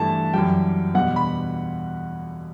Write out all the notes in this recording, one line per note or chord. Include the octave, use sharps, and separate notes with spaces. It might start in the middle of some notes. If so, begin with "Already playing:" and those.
Already playing: G2 E3 A3 A5
F#2 E3 G3 G5
E2 B2 G3 B3 F#5
B5